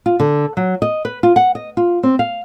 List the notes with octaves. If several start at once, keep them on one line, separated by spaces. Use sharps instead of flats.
F4
D3
F#3
D#5
B4
F4
F#5
D#5
F4
C4
F5